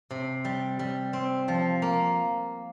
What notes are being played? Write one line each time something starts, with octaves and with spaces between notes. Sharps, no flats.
C3
G3
G3
C4
F3
A#3